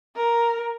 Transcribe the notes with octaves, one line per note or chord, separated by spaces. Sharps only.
A#4